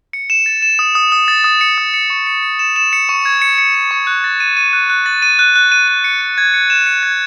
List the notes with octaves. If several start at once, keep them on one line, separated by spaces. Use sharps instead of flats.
C#7
E7
A6
E7
D#6
D#6
D#6
A6
D#6
C#7
D#6
C#7
C#6
C#7
C#7
E7
E7
C#7
C#6
G#6
C#7
C#7
C#7
C#6
F#6
A6
D#7
D#7
F#6
F#6
A6
D#7
F#6
F#6
D#7
D#7
C#7
C#7
G#6
C#7
E7
C#7
G#6